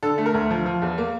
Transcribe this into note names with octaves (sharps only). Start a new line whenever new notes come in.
D3 A4
A3
A#4
D2
F3
F3
E2
A#3